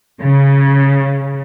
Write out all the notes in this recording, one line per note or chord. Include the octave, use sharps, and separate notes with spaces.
C#3